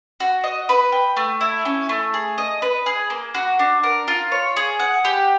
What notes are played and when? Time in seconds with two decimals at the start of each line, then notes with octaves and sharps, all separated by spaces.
0.20 F#4
0.44 D#5
0.69 B4
0.92 G5
1.17 A3
1.41 E4
1.65 C#4
1.89 A3
2.14 G#4
2.38 D#5
2.62 B4
2.86 G#4
3.10 A#3
3.35 F#4
3.59 D4
3.83 A#4
4.08 F4
4.32 C#5
4.56 G#4
4.80 F#5
5.05 G4